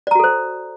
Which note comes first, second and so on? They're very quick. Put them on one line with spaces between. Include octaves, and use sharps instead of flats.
D5 A#5 F#4 A4 C5